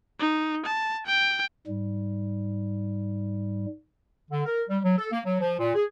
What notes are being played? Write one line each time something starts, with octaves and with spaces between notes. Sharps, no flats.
D#4
A5
G5
G#2 G3
D3
A#4
G3
F#3
A4
A#3
F#3
F3
A#2
G#4